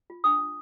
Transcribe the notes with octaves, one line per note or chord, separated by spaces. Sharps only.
F4
D4 D#6
D4